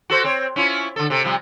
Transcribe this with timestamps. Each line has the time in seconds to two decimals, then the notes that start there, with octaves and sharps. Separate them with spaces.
0.10 F#4 A4 C5
0.24 C4 C#5
0.56 C#4 E4 F4
0.96 D3 A4
1.10 C3 A4
1.24 C3 F3 G3